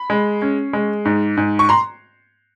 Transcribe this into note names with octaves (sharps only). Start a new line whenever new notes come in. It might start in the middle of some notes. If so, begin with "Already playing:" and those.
Already playing: B5
G#3
C#4
G#3
G#2
G#2
C#6
A#5 C6